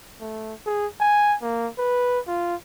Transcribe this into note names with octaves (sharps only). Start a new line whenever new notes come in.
A3
G#4
G#5
A#3
B4
F4